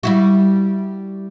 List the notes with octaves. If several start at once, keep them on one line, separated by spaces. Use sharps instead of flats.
G3 E4 F#4